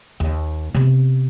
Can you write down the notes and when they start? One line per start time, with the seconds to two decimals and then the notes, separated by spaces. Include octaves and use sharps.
0.20 D#2
0.75 C3 B3